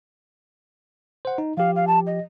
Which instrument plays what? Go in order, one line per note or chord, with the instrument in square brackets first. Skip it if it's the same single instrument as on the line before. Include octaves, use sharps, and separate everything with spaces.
[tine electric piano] C5 F#5
D#4
[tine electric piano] F3 G4 [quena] F5
[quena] F5
A5
D#5